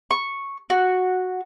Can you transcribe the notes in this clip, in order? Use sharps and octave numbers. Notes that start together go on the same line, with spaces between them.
C#6
F#4